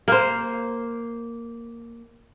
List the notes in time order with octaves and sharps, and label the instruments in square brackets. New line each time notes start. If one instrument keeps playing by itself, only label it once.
[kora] A#3 C5